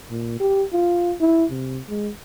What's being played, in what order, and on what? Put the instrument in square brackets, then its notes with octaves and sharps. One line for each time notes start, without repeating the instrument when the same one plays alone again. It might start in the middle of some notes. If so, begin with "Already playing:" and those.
[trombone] A#2
G4
F4
E4
C3
G#3